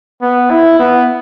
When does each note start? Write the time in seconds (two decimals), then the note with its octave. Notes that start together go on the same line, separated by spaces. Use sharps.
0.22 B3
0.51 E4
0.79 B3